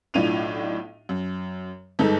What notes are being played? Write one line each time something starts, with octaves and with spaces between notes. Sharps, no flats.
B1 A2 D4 F4 D#7 F7
F#2
G1 G#2 D#4 A4